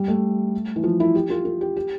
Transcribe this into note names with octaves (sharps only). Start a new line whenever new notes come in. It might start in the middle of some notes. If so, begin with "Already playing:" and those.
Already playing: G3
A3
E3
F3
E4
G4
F4
F4
G4
G4